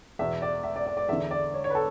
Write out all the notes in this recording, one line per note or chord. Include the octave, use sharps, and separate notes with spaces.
E2 B2 E5
D5
E5
D5
D5
D5
E2 D3 E5
D5
C#5
C#5
B4
A4